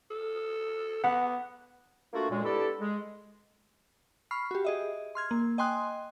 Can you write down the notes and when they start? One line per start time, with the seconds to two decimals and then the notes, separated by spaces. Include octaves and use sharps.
0.10 A4
1.03 B3 F#5
2.13 A3 A#3 D4 F4 F#4
2.30 F#2 A#2 G#3
2.43 B3 D4 E4 G4 A4
2.80 G#3
4.31 B5 C#6 F6 C7
4.51 F#4 G4
4.65 G#4 D#5 E5
5.15 C6 F6 G#6
5.31 A#3
5.58 D#5 G5 G#5 C6 D#6 F#6